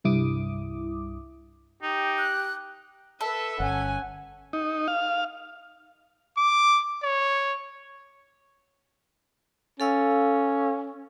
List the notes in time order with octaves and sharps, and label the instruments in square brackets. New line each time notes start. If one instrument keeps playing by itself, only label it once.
[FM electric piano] C2 G2 E4 D6 D#6
[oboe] D#4 [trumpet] G4
[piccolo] F#6
[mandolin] A4 [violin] B4 E5
[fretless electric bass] G1 [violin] C#4 G#5 [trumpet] F#5
[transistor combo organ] D#4
F5
[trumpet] D6
C#5
[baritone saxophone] C#4 [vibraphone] A4 F5 E6